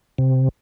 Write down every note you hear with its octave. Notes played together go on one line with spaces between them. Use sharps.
C3